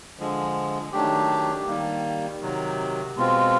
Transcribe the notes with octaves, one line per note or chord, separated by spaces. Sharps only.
D3 F3 G#3
D#3 F#3 A3 D4 G4
D#3 G3 A#3
C3 D#3 F#3
B2 G#3 C4 F4